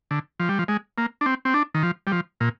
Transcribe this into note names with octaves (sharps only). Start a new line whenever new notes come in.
D3
F3
G3
F3
G#3
A#3
D4
C4
C4
D4
D#3
F3
G3
F3
A#2